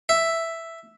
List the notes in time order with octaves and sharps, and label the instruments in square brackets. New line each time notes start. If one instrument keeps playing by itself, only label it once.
[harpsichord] E5